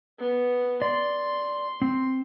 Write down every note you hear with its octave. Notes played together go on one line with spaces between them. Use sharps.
B3
D5 C6
C4